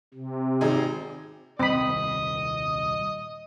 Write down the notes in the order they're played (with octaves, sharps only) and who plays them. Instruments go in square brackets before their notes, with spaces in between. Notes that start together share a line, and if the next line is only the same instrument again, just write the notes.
[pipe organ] C3
[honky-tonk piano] G#1 D#4 G#4
[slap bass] D#1 C2 [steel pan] C4 B5 [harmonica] D#5